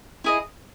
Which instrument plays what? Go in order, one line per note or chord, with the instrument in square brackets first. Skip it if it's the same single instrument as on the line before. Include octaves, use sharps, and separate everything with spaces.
[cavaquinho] E4 G#4 D#5